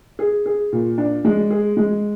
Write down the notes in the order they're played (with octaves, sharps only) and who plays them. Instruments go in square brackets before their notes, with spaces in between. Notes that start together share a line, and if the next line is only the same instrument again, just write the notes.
[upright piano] G#4
G#4
A#2
D4
G#3
G#4
G#3